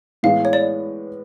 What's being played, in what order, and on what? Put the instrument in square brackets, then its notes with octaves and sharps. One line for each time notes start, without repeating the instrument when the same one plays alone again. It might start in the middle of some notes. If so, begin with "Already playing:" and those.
[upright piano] A2 E3 G#3 B3 E4 [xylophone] F5
[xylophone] C#5
D5